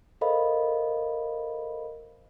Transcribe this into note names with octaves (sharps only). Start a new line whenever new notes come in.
A4 A#4 C5 D#5 F5 B5